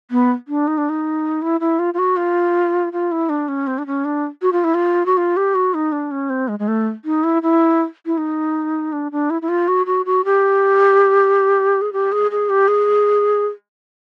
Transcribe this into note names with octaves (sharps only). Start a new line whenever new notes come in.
B3
D4
D#4
D4
D#4
E4
E4
F4
F4
F#4
F4
F4
E4
D4
C#4
C4
D4
C#4
D4
F#4
F4
E4
F4
F#4
F4
G4
F#4
D#4
D4
C#4
C4
G#3
G#3
A3
D#4
E4
E4
E4
D#4
D4
D4
E4
E4
F4
F#4
F#4
F#4
G4
G#4
G4
G#4
G#4
G4
G#4